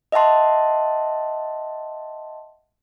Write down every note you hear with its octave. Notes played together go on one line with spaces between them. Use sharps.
D#5 E5 F#5 A5 C6